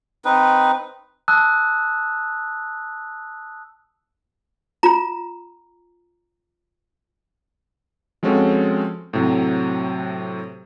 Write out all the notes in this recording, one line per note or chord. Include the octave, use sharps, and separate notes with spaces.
C4 D#4 B4
A5 D#6 E6 F#6
F4 A#5
F3 G#3 C4 C#4 F#4 A4
A2 C3 F#3